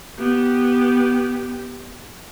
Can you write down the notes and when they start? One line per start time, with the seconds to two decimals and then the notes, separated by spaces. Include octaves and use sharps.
0.18 B3 G4